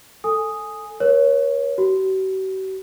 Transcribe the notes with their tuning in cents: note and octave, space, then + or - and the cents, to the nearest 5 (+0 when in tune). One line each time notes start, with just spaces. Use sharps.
A4 +5 G#5 +0 D#6 +0
A#4 +45 C#5 +0
F#4 +45 B5 +0